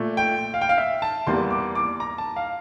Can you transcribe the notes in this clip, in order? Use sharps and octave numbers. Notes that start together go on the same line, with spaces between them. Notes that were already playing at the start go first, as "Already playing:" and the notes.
Already playing: A#2 A3
G5
F5
G5
F5
E5
A5
E2 E3 G3 A#3 C6
D6
D6
A#5
A5
F5